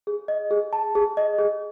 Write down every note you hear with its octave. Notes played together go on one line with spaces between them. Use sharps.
G#4
D#5
G#4
A5
G#4
D#5
G#4